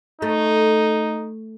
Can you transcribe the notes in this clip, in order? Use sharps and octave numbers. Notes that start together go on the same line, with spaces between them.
A3 D#4